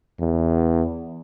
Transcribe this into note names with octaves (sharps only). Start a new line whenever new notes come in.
E2